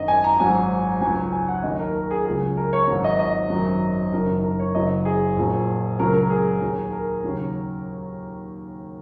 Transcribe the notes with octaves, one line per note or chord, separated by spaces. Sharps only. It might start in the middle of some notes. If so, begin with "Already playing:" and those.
Already playing: G#1 F#2 D#3 F#3 D#5
G#5
A#5
G#1 G#2 F#3 G#5
C#2 C#3 F#3 G#5
G#5
F#5
D#2 D#3 F#3 D#5
A#4
A#4
G#4
C#2 C#3 F#3 G#4
A#4
C#5
G#1 G#2 D#3 F#3
D#5
D#5
G#1 F#2 D#3 F#3
F#1 F#2 D#3 F#3 A#4
A#4
C#5
F#1 F#2 F#3 D#5
G#4
A#1 A#2 F#3
C#2 C#3 F#3 A#4
A#4
G#4
D#2 D#3 F#3
A#4
D#2 C#3 F#3